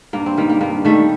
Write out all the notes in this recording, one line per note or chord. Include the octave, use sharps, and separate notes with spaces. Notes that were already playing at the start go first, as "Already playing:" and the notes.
G2 A#3
C4
D#3 G3 A#3
A#3
G2 A#3
D#3 G3 A3